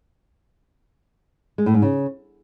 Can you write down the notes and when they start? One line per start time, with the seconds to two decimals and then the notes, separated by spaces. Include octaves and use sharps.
1.58 G#3
1.66 A2
1.74 G#2
1.82 C#3